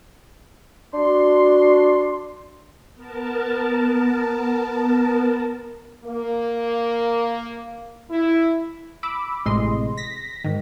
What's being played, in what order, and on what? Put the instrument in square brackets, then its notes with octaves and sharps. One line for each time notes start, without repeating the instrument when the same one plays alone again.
[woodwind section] D4 F#4 C6
[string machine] B3 A#4 A5
[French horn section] A#3
E4
[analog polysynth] B5 D6 E6
A1 A2 C3 G#3 D#5 C6
A#6 B6
G#2 D#3